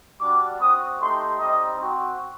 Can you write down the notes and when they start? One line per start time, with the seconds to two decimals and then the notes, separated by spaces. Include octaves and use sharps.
0.20 G3 D4 F#4 D6
0.61 C4 F#4 D#6
0.99 A3 D#4 G4 C6
1.38 G3 C4 D#4 D#5
1.78 C4 F#4